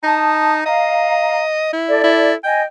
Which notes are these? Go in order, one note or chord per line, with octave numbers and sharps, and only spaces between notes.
D#4 A5 D#6
D#5 F5 A#5
E4
A4 D5
E4
D#5 G5 G#5